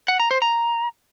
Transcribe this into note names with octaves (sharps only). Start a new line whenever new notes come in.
F#5
A#5
C5
A#5